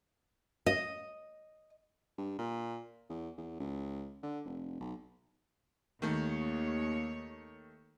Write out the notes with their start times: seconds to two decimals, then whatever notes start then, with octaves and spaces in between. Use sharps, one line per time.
0.66 D#5
2.18 G2
2.38 A#2
3.10 E2
3.37 E2
3.60 C#2
4.23 D3
4.45 F1
4.80 B1
6.02 D#2 D#3 A3 C#5